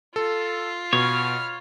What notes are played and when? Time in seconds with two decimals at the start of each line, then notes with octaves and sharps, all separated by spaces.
0.16 F4 A4
0.93 B2 C#5 B5 F6